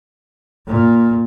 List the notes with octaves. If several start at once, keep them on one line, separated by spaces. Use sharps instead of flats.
A#2